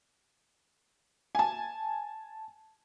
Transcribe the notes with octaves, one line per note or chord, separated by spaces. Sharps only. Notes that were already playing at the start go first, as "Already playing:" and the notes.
G#5 A5